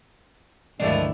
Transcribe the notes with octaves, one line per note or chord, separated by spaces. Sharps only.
G1 C#2 D3 D#3 F3 A3 D4 E4